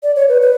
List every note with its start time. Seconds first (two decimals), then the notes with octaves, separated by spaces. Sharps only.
0.03 D5
0.16 C#5
0.29 B4
0.42 B4